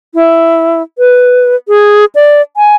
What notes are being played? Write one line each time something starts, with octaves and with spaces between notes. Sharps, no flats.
E4
B4
G#4
D5
G#5